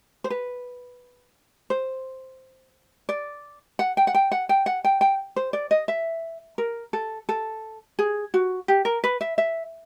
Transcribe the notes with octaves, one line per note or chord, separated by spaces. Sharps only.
C5
B4
C5
D5
F#5
G5
F#5
G5
F#5
G5
F#5
G5
G5
C5
D5
D#5
E5
A#4
A4
A4
G#4
F#4
G4
A#4
B4
E5
E5